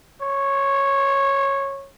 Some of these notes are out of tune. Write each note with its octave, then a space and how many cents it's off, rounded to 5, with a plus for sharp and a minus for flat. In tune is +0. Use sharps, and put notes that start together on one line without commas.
C#5 -10